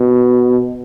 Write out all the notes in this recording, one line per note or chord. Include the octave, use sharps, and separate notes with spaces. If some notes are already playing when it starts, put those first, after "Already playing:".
Already playing: B2